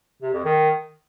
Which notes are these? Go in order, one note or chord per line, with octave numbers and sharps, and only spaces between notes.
C3
F2
D#3